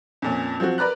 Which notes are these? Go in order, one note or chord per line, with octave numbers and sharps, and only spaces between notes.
F2 A#2 C#4
F3 F#3 C4 F#4
A#4 B4 D5 A#5 F#6